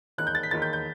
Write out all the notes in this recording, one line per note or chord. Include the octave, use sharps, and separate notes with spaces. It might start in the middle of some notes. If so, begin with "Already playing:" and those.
E1 D#2 D#3 F#6
G6
A6
B6
E1 D#2 D#3 A6
G6
G6